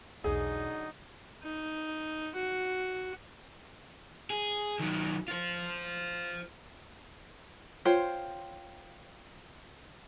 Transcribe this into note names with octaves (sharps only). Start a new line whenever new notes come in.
B1 E2 D3 F#3 D#4 G#4
D#4
F#4
G#4
D#3 F#3
F4 C5
F4 C5 C#5 G5